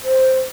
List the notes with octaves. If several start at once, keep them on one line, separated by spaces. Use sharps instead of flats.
C5